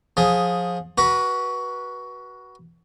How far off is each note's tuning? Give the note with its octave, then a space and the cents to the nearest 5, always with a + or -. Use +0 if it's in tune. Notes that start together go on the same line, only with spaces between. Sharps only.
F3 +25 G#4 +5
F#4 +15 B4 -20